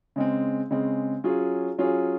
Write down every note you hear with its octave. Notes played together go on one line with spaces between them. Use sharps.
C#3 G#3 C4
C#3 G#3 C4
F#3 C#4 F4 G#4
F#3 C#4 F4 G#4